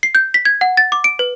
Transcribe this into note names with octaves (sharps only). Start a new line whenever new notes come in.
C7
G6
B6
G#6
F#5
A6
D6
D7
B4